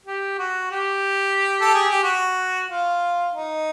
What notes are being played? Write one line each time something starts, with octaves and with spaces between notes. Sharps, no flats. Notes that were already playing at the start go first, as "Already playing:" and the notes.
G4
F#4
G4
A4
G#4
G4
F#4
F4
D#4